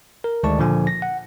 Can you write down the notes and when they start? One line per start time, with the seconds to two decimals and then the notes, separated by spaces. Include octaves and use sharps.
0.24 A#4
0.43 D2 D#3 G#3 D5 A5 C#6
0.59 A#2 D3 F3 G#5
0.87 A#6
1.02 F#5